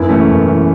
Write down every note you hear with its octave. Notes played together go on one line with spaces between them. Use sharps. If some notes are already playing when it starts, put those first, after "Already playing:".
Already playing: F#2 B3 E4
E3 A3 C#4
F#2
E3